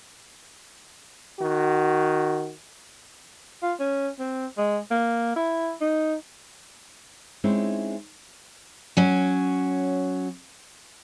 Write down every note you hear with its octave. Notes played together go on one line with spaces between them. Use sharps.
D#3 F#4
F4
C#4
C4
G#3
A#3
E4
D#4
G#3 C4 C#4 D#4 E4
F#3 C#4